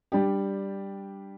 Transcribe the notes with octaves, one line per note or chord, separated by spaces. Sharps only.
G3 D4 G4